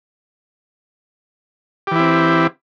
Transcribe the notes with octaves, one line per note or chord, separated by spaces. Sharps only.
E3 C4 E4 G4